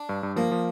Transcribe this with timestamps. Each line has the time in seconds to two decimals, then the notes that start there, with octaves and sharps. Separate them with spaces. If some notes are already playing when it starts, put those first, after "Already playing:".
Already playing: D4
0.09 G2
0.23 G2
0.36 F3 A#3
0.51 F3